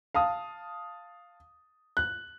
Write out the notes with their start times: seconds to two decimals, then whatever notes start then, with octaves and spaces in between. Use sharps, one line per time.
0.15 F5 A5 D#6
1.97 F#6